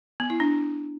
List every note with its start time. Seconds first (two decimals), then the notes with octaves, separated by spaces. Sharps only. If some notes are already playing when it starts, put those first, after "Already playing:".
0.20 B3
0.30 E4
0.40 D4